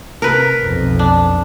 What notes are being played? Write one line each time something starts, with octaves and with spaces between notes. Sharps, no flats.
C3 A#4 B4
B1 F2
D4